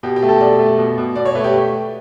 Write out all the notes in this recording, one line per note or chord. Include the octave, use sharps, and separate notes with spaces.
B2 G4
G4
A3
A4
B2 D5
A3
B2
B2
B2 D5
C#5
A3 B4
G4